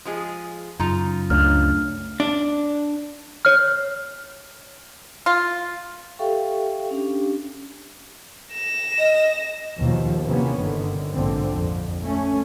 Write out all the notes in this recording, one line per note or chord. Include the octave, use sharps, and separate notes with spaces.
F3 G#3 G#4
F#2 C#3 D#4 F4 A#5
C#2 A3 D4 F6
D4
C#5 F6
F4
G4 A4 E5 F5 G5 C#6
C#4 D4 G4
A#6 E7
D#5
D#2 B2 D#3 F3
C3 E3 A#3 B3 C#4
G1 D3 D#3
A#1 G#2 D3 C4
F2
A3 C#4